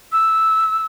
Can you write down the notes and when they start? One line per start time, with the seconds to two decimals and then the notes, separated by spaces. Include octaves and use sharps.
0.12 E6